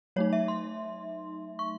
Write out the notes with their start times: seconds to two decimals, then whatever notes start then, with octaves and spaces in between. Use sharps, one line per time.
0.16 F#3 A3 D#4 C#5
0.33 E5
0.48 C6
1.59 C#6